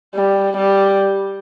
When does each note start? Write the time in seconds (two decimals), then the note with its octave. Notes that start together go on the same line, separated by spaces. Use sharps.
0.15 G3
0.57 G3